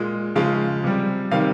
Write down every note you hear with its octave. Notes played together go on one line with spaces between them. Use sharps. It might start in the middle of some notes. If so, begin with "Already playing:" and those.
Already playing: A#2 G#3
C#3 F3 G#3 F5
C3 G3
C3 D#3 G3 F5